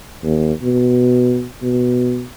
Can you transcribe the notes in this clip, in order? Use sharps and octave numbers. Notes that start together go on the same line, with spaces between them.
D#2
B2
B2